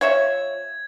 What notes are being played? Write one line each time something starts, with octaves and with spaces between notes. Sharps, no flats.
F3 C#5 E5 G#6